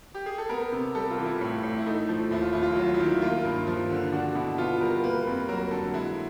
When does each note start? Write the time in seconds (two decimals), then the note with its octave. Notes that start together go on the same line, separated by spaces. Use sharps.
0.14 G4
0.26 G#4
0.38 A4
0.49 B3 A#4
0.72 C3
0.95 G3 A4
1.10 F4
1.18 E3
1.25 E4
1.41 A2
1.63 A2
1.78 E4
1.86 A3 D#4
2.09 F3
2.31 D#2 E4
2.41 F4
2.53 D#2 E4
2.63 F4
2.73 F#3 E4
2.84 F4
2.94 E4
3.00 D#3
3.22 A#3 F4
3.45 G2
3.67 F3
3.90 D3
4.12 D4 F#4
4.35 B2 E4
4.58 B3 F4
4.81 G3 A#4
5.04 A#3 B4
5.27 F2
5.49 F#3 A#4
5.71 D3 A4
5.94 G#3 E4